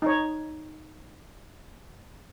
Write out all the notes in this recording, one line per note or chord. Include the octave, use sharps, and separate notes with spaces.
D#4 C#5